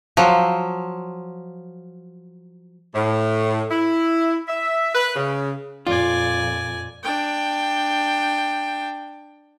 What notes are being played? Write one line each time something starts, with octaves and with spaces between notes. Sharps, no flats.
F3 F#3
A2
E4
E5
B4
C#3
F2 A#2 F4 D5 G#5
D4 G5